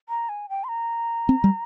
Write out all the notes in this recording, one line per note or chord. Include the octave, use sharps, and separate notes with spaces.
A#5
G#5
G5
C6
A#5
C4
G3